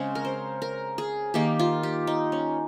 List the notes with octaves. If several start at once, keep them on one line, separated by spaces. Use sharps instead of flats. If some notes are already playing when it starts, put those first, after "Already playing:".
Already playing: C#3 G#3 C4 C#4
A#4
C5
A#4
G#4
D#3 A#3 G4
F4
G4
D#4
C#4